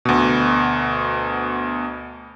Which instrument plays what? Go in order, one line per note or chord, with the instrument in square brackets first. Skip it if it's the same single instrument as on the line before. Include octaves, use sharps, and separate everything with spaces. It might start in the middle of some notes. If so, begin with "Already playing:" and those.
[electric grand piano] D2 B2